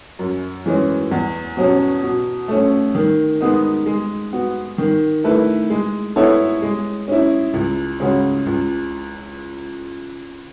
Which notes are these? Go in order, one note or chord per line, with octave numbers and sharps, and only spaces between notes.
F#2
E3 G#3 C#4
E2
B2 F#3 C#4
B2
A3 C#4
D#3
G#3 B3 D#4
G#3
B3 F#4
D#3
A3 E4 B4
G#3
B3 E4 A4 C#5
G#3
C#4 E4
C#2
C#3 G#3 C#4 F#4
C#2